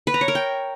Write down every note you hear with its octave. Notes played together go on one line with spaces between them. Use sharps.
B4
A#5
C#5
A#4
G5